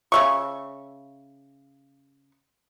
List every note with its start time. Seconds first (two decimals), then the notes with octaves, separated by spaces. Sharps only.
0.12 C#3 E5 C#6